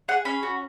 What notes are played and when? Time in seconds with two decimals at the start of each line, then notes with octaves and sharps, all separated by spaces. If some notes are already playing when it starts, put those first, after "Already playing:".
0.08 G#4 F#5
0.25 C#4 B5
0.43 F#4